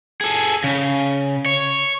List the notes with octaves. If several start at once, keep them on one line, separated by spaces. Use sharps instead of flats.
G#4 A4
C#3
C#5